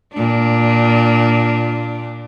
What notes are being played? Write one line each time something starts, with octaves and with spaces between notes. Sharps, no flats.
A#2 D4